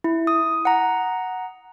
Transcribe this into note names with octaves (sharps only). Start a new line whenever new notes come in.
E4
D#6
F#5 A#5